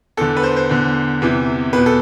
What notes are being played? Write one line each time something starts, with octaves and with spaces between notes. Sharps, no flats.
E2 D3 A4
B4
C5
C5
E2 D3
E2 C3 E3
E2 B2 B4
A4